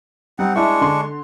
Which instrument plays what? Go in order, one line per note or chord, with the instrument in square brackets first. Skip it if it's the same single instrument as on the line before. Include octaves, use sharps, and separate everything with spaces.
[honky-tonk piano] G3 [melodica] C4 D#4 F#5
[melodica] G#3 D4 C#6 [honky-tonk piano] E4
[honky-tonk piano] D3 C6